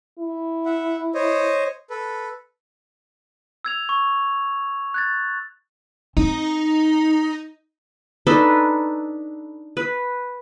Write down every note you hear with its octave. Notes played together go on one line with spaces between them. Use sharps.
E4
E5 F#5
C5 C#5 D#5
A4 B4
E6 G#6 F7
C#6
F#6 G#6 A6
C4 D#4
D4 D#4 A4 B4
B4